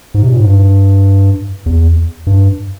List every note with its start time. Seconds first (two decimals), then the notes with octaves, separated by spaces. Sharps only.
0.14 G#2
0.22 C3
0.29 A#2
0.37 G#2
0.45 G2
1.66 E2
2.27 G2